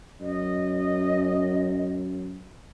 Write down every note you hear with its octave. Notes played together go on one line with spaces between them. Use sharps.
F#2 D#5